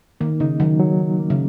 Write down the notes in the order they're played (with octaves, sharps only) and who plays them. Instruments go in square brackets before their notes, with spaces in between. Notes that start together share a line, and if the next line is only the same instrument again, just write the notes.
[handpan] D#3 [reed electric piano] A#3
[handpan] C#3 [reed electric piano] D#4
[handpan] D#3 [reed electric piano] F#3
[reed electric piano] F#3
F#3
A#3
[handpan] C#3